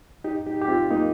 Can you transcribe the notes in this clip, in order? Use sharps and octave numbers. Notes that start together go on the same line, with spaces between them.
D#4 G4
D#4 G4
G4
C4 F4
A#3 D#4